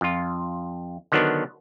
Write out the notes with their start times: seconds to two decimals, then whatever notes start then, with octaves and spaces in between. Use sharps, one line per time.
0.01 F2 F4
1.12 D3 D#3 F#3 B3 D4